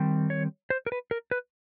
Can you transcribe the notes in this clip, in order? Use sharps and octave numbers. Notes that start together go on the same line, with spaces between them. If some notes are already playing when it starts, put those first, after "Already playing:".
Already playing: D#3 G3 C4
C#5
C5
A#4
B4
A#4
B4